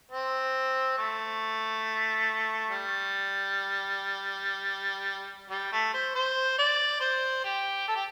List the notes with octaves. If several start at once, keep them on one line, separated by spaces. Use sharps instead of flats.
C4
A3
G3
G3
A3
C5
C5
D5
C5
G4
A4
G4